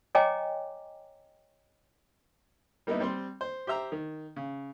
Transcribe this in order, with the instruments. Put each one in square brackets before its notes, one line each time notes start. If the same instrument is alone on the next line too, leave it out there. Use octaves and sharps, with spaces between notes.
[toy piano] C#5 D#5 G5 G#5 A#5 D6
[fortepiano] G3 A#3 B3 D#4 E4
G3 C4 C6
C5
G4 C5 E5 A#5
D#3
C#3